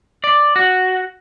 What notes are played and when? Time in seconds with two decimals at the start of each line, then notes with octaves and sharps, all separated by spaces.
0.24 D5
0.56 F#4